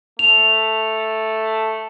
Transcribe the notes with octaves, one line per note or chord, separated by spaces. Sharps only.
A3 F7